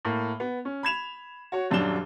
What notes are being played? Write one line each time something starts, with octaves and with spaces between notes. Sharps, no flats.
A2 A#3
B3
C#4
B5 G#6 E7 F7
F#4 C#5
D#1 F#2 F#3 D4 E7 G7